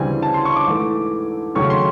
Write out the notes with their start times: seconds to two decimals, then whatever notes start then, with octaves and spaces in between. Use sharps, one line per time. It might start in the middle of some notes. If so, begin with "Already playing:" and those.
Already playing: D2 C#3 E3 G3 C4 G#5
0.22 A5
0.34 C6
0.45 C#6
0.56 D6
0.67 G#2 E3 A3
1.55 D#2 C#3 F#3 A3 C#4 C#6
1.70 C6